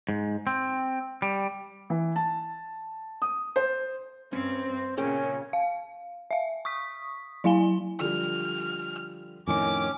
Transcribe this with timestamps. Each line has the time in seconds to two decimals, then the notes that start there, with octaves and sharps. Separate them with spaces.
0.09 G#2
0.47 C4
1.22 G3
1.90 E3
2.16 A5
3.22 D#6
3.56 C5
4.33 G2 C4 C#4 C5
4.98 A#2 C#3 C#4 G#4 A#4 G5
5.53 F5
6.31 E5 F5
6.65 C#6 D#6 B6
7.44 F#3 E4 F5 G#5 G7
8.00 D3 F3 G3 F6
9.47 F2 A2 D#3 C#4 D6